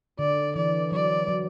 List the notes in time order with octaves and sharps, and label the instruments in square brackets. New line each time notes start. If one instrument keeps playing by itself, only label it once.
[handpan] D3 [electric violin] D5
[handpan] E3 [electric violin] D5
[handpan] F#3 [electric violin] D5
[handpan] F#3